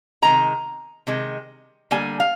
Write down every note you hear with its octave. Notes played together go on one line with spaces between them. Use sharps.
C3 D#3 G#3 A#5
C3 D#3 G#3
D3 G3 A#3 G#5
F5